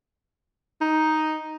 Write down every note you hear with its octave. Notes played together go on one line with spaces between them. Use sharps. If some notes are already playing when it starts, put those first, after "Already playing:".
D#4